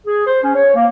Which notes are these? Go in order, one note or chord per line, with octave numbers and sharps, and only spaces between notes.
G#4
C5
C#4
C#5
A#3